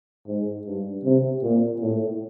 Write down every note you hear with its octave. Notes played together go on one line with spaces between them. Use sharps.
G#2
G2
C3
A#2
A2